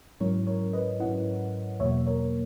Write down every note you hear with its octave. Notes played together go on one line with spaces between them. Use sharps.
G#2 F#3 C#4 E4 A#4 C#5
A#4 C#5
B4 D#5
G#2 F#3 C#4 E4 D#5 F#5
E2 B2 F#3 A#3 C#5 E5
A#4 C#5